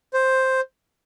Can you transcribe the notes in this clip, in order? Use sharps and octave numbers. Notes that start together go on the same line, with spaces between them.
C5